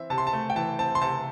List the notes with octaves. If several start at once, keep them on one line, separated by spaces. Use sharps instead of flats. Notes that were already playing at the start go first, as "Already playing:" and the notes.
Already playing: E3 C4 E5
C3 A5
C6
A5
A3
G5
E3 A5
C4 A5
C6
C3 A5